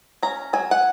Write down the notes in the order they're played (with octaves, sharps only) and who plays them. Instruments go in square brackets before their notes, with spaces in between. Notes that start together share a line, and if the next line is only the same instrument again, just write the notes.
[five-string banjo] C#4 A#5
F#3 G#5
F#5